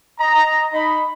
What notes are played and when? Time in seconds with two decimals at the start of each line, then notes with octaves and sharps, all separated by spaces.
0.18 D#5 A#5
0.73 D#4 B5